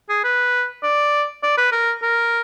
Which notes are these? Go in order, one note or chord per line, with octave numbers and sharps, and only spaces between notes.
G#4
B4
D5
D5
B4
A#4
A#4